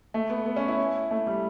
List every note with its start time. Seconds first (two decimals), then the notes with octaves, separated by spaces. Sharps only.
0.14 A3
0.30 B3
0.46 B3
0.56 C#4
0.68 E4
1.11 A3
1.27 G3